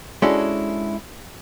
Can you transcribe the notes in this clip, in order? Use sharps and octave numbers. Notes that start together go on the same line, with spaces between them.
G#3 C#4 D4 E4 F#4 A4